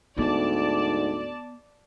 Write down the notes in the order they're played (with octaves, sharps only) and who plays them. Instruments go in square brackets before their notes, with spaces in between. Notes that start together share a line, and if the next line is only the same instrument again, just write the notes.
[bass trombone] D2 [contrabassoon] G#2 [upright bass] B3 [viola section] D5 A5